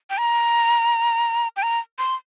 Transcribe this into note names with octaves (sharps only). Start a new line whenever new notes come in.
G5
A#5
G5
A#5
C6